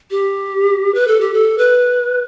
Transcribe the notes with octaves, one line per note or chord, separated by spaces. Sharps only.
G4
B4
A4
G4
A4
B4